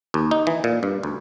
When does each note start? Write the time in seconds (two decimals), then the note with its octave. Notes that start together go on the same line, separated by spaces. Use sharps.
0.14 D#2
0.31 D#4
0.47 E3
0.64 A#2
0.83 G2
1.03 D2